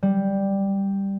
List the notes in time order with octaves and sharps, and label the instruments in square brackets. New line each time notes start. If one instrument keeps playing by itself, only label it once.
[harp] G3